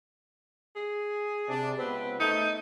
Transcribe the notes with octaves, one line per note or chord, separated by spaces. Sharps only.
G#4
C3 D4
C#2 B3 C4 B4
A3 D#4